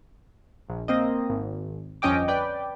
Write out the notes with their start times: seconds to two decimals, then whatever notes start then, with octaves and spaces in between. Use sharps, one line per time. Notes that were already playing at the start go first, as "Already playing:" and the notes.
0.69 A#1
0.88 A#3 C4 D#5
1.30 G#1
2.02 G1 F2 C#4 D#5 G5 D6
2.28 B4 D5 G5